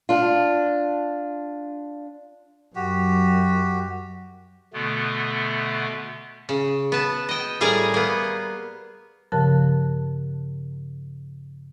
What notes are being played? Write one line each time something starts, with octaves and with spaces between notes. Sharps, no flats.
D4 F4
F#2 F#4 G4
B2 D3 A3 B3
C#3
B3 A5
D#5 G5
A2 G3 G#4 A#4 A#5
A#3 B3
G2 C#3 F3 A#4 A5 F#6